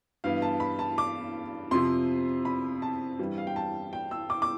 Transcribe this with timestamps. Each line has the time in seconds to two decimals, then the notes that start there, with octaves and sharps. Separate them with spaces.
0.24 G2 E3 B3 F5
0.42 A5
0.60 B5
0.79 A5
0.98 D6
1.71 F2 C3 F3 C6
2.45 B5
2.82 A5
3.19 G2 E3 G3
3.38 F5
3.47 G5
3.56 A5
3.93 G5
4.11 E6
4.30 D6
4.42 D6